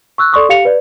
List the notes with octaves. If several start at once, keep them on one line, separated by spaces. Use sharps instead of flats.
C#6 E6 F#6
A4 D5 C6 C#6 D#6
G4 F5 C#7 F7
B4 D5